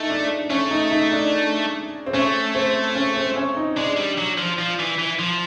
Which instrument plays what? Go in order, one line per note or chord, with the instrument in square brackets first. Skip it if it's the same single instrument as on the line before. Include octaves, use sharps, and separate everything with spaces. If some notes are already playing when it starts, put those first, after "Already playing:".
Already playing: [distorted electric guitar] A3 [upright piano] D#4
[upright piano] D4
[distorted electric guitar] A3 [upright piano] C#4
[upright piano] D#4
D#4
D4
C4
[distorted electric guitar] A3 [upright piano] C#4
[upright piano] C4
C#4
C4
C#4
D#4
[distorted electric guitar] G#3 [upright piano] D4
[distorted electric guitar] G3
F#3
F3
F3
E3
E3
F3